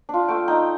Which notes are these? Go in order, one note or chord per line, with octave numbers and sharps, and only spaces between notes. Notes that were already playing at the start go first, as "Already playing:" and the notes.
D4 F4
A3 G5
D#4 G5